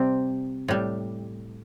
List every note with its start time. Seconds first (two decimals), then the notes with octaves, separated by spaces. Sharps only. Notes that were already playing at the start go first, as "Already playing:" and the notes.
Already playing: C3 G3 C4
0.68 A2 G3